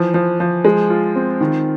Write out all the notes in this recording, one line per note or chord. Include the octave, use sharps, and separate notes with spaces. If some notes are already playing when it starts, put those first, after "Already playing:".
Already playing: E3 F3
F3
F3
G#3
F4
C4
D#3